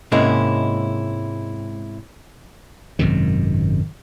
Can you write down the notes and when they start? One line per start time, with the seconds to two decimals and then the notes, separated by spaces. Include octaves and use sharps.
0.12 G#2 C3 G#3 A#3 C#4 E4
2.99 G#1 F#2 C3 D#3